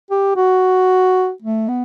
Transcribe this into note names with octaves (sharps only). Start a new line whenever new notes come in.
G4
F#4
A3
B3